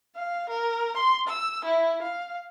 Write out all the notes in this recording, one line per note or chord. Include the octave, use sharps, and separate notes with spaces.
F5
A#4
C6
E6
E4
F5